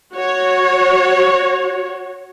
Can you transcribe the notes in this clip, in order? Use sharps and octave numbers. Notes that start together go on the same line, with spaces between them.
F#4 C#5